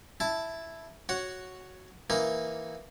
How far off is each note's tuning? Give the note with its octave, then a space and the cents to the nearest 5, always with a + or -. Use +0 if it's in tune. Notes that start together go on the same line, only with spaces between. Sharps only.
E4 +0 A5 +0
F#4 +0 C#5 +0 F#5 +0
E3 +0 A#3 +0 D#4 +15